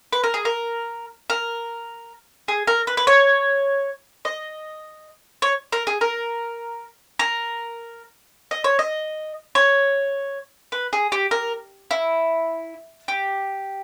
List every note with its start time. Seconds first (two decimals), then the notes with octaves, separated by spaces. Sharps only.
0.13 B4
0.23 A#4
0.34 G#4
0.45 A#4
1.30 A#4
2.48 G#4
2.67 A#4
2.87 B4
2.97 B4
3.07 C#5
4.25 D#5
5.42 C#5
5.72 A#4
5.87 G#4
6.01 A#4
7.19 A#4
8.51 D#5
8.64 C#5
8.79 D#5
9.55 C#5
10.72 B4
10.93 G#4
11.12 G4
11.31 A#4
11.91 E4
13.08 G4